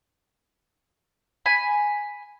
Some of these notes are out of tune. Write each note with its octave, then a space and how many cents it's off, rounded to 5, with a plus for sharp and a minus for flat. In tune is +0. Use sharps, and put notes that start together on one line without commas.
G#5 +0 B5 +0